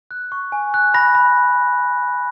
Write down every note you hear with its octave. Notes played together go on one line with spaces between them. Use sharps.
F#6
C#6
G#5
F#6
B5 A#6
B5